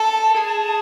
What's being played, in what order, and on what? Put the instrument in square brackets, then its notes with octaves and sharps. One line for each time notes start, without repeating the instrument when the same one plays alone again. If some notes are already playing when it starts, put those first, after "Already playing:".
Already playing: [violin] A4 [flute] A5
[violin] G#4